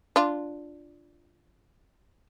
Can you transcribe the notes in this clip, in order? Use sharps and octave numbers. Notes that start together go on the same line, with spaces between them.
D4 F4